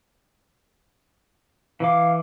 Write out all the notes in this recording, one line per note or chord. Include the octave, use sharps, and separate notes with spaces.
E3 F5 D6